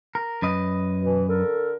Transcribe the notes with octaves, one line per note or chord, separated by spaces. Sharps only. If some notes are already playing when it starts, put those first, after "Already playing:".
A#4
F#2 B4 D#5
B2 E3
D3 A4 A#4